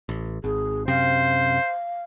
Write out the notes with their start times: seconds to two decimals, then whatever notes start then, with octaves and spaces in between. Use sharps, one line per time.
0.09 A1
0.44 G#1 G#4
0.88 F#2 C3 C4 C5 F5